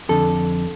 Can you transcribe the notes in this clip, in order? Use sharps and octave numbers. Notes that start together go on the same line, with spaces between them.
F2 D3 A4